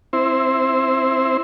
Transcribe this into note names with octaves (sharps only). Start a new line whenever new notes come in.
C4 E4 C5